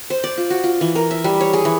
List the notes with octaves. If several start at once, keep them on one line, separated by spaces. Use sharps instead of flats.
C5
D5
F4
F#4
F4
E3
A#4
E5
G3
C#5
G#4
E3